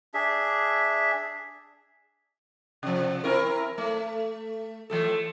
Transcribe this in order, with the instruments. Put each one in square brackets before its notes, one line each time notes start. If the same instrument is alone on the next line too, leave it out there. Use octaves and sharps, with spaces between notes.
[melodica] D4 G#4 E5
[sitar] C3 F3
C4 E4 A#4
A3
E3 A3 A4